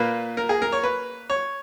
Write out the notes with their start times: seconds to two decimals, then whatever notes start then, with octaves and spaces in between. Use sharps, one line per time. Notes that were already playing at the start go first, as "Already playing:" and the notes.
Already playing: A#2 A#3 B4
0.37 A#4
0.49 G#4
0.62 A#4
0.72 C#5
0.83 B4
1.30 C#5